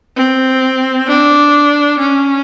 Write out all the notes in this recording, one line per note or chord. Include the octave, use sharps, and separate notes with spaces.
C4
D4
C#4